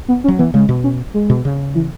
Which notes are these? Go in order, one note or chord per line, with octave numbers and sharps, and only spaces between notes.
B3
C#4
F#3
E3 B3
C#3 G#3
B2
C#4
G#3
B2
C#3
E3